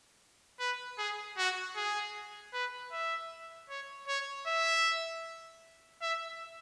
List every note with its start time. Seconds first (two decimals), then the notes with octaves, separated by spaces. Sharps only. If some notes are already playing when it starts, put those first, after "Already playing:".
0.60 B4
0.98 G#4
1.38 F#4
1.76 G#4
2.54 B4
2.92 E5
3.70 C#5
4.08 C#5
4.47 E5
6.02 E5